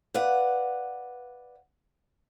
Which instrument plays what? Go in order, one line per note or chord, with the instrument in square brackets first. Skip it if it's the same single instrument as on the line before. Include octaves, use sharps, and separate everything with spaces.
[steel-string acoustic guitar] B4 D5 F5 F#5